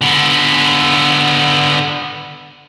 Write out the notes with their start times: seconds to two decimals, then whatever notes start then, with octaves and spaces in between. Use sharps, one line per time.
0.02 D3 B3